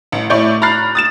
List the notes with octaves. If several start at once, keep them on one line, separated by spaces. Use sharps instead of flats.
A1
A2 E4 C#5 D5 C#6 G6
A#5 B5 F6 F#6 A6 C7
D#6 A6 E7